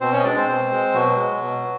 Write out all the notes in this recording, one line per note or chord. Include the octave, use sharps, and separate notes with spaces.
B2 C4 C5
C#4 C#5
D#5
G#3 D4 D5
C4 C5
B2
G#3
B2 F#3 F#4
G#3
B2